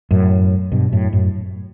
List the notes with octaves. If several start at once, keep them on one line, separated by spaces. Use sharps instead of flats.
F#2 A2
G2 B2
F#2 A2
F#2 A2